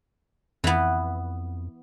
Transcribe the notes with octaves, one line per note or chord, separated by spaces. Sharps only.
F2 E3 B3